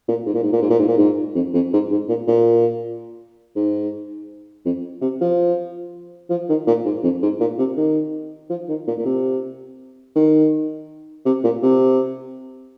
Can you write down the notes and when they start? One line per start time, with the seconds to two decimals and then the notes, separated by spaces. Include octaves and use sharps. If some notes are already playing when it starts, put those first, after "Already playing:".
0.08 A#2
0.26 G#2
0.34 A#2
0.43 G#2
0.53 A#2
0.62 G#2
0.70 A#2
0.79 G#2
0.88 A#2
0.98 G#2
1.36 F2
1.54 F2
1.73 G#2
1.91 G#2
2.09 A#2
2.28 A#2
3.56 G#2
4.66 F2
5.02 C3
5.21 F3
6.30 F3
6.49 D#3
6.67 A#2
6.86 G#2
7.03 F2
7.23 G#2
7.40 A#2
7.59 C3
7.77 D#3
8.50 F3
8.69 D#3
8.88 A#2
8.98 A#2
9.06 C3
10.16 D#3
11.26 C3
11.44 A#2
11.63 C3